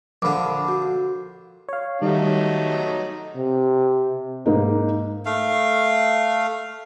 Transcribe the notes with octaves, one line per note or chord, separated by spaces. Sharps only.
A#1 D3 B5 D6
F#4
C#5 F5
D#3 F#3 G3 A3 D#4
C3
G#2 A#3 D#4
A3 F5